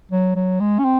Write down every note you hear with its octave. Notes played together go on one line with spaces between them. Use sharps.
F#3
F#3
G#3
C#4
C4